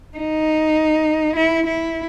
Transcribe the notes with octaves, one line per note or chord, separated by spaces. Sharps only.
D#4
E4
E4